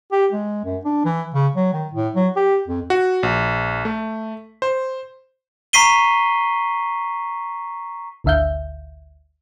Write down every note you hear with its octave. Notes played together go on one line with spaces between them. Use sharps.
G4
G#3
F#2
D4
E3
C#3
F#3
D#3
A2
F#3
G4
F2
F#4
A#1
A3
C5
A#5 C#6 B6 C7 D#7 G7
G#1 D2 D3 E5 F5 G6